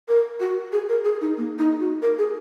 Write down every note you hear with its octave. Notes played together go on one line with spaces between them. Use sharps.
A#4
F#4
G#4
A#4
G#4
D#4
A#3
D#4
F#4
A#4
G#4